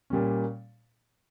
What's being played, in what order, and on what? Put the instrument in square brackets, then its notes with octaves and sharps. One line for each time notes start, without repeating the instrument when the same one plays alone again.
[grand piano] A#2 G3 A#3 C#4